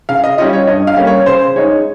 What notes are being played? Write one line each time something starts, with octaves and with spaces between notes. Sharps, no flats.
C#3 F5
D#5
G3 C#4 F4 D#5
C#5
G2 D#5
F5
G3 A#3 C#4
C#5
C#3 C5
G#3 D#4 C#5